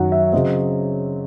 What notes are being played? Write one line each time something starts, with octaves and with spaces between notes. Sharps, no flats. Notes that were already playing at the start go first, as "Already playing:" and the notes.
Already playing: F#2 D#3 F#3 F#5
E5
C#3 F#3 C4 D#5